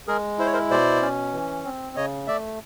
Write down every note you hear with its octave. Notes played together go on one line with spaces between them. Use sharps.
G#3 G#4 A#4
E4 C5
C#5
A#4 C5
B2 C5 D5
C#4
E3
C4
C#3 C#5 D#5
A3 D5 E5